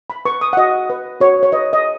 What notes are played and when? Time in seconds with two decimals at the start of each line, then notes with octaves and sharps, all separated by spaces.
0.10 B5
0.25 B4 C#6
0.41 D#6
0.53 F#5
0.57 F#4 D#5
0.90 B4
1.20 F#4 C#5
1.43 C#5
1.52 B4 D#5
1.73 D#5